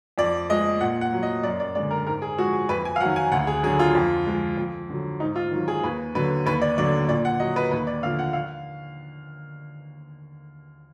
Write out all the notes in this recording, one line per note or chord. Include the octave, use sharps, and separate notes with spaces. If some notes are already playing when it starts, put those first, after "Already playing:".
F2 D5
F3 G#3 D#5
A#2 F#5
F#5
F#3
D#5
F#2 D5
D5
D3 G#3 D5
A#4
G#2 A#4
G#4
F3 G#3 F#4
G#4
F2 B4
G#5
F5
D#3 F#3 F#5
G#5
D2 F#5
G#4
D3 F#3 G#4
F4
F2
F3 G#3
F2
D3 F#3
G#2 D#4
F4
D#3 F#3
G#4
D#2 B4
D3 F#3 B4
D#2 B4
D5
D3 F#3 D5
A#2 D5
F#5
F#3 D#5
B4
D#2 B4
D5
D3 F3 F5
F#5
F5